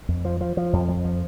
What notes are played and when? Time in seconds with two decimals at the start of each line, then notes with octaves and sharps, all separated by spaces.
0.09 F2
0.25 F3
0.41 F3
0.57 F3
0.73 F2
0.88 F2
1.05 F3